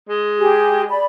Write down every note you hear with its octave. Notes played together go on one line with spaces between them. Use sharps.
G#3
G4 G#4
D5 B5